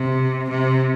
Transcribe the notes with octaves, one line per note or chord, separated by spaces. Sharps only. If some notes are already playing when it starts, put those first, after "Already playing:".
Already playing: C3
C3